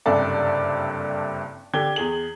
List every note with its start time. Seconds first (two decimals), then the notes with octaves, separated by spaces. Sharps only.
0.06 F#1 G2 C3 A4 D5 E5
1.73 D3 D4 G4 G#6 G7
1.96 E2 G#4 F#7